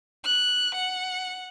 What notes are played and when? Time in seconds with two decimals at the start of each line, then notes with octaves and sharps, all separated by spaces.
0.25 F#6
0.75 F#5